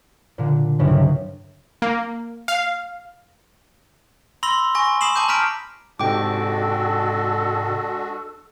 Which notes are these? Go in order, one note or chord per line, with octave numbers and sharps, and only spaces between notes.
A#2 D3
C2 G2 C#3 F#3
A#3
F5
B5 C6 E6 A#6 G7
G#5 C#6 A#6
B5 D#6 C7 E7 F#7
A5 D6 G6
A5 A#5 F6 B6 D7
G#2 C3 G#3 D4 F#4 A4 G5 D6